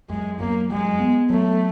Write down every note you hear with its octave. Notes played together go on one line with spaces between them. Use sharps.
F#2 G#3
F#2 A#3
F#3 G#3
B3
F#3 A3